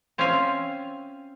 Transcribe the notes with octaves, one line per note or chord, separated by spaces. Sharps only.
C4 C#4 F4 E5 F5 G#5